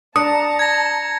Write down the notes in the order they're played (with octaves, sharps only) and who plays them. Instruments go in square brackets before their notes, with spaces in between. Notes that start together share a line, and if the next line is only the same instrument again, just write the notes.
[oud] D4 [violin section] A5 A#5 [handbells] D#6 [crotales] C#7
[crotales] G#6 A#6